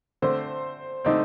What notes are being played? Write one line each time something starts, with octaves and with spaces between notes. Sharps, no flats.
D3 A3 C4 C5
D3 A3 C4 D#4